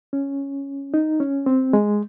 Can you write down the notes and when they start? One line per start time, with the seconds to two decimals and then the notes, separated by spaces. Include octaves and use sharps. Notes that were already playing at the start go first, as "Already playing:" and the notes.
0.13 C#4
0.94 D#4
1.20 C#4
1.46 C4
1.73 G#3